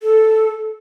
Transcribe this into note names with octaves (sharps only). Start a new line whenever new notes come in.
A4